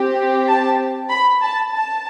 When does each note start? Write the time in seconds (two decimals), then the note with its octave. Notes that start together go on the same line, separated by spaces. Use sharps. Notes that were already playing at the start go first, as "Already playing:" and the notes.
Already playing: C4 G4
0.48 A5
1.10 B5
1.41 A5
1.72 A5